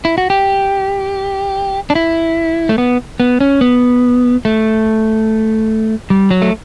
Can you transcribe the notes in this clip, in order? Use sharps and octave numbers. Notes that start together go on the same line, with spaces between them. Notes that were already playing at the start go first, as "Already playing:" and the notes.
E4
F#4
G4
D4
E4
A3
B3
B3
C#4
B3
A3
G3
F#3
A3